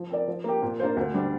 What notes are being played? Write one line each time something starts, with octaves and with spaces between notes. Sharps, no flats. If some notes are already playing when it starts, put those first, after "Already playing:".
Already playing: F3
C4 A#4 D5
F3
A#3 G4
A#2
A#3 D4 F4 C5
D2
D3 G3 D4